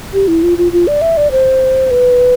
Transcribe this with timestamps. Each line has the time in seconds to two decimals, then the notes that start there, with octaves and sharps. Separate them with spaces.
0.13 G4
0.28 E4
0.43 F4
0.58 F4
0.72 F4
0.87 D5
1.01 E5
1.17 D5
1.31 C5
1.91 B4